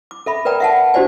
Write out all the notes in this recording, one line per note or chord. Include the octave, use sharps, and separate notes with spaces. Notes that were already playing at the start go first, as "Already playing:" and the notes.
D6
A4 E5 B5
A#4 B4 D5 G5 A#5
E5 F#5 A5
D4 F#4 G4 C5 D5 G#5